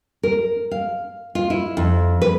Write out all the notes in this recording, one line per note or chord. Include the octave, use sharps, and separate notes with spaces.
A#4
F5
F4
E4
F2
B4